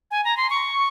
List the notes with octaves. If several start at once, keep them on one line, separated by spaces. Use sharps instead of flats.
G#5
A#5
C6
C#6